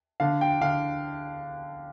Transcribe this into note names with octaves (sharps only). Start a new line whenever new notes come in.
D3 F5
G5
D3 F5